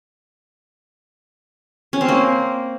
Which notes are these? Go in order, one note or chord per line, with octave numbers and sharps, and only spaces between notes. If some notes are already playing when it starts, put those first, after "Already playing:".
C#4
C4
A#3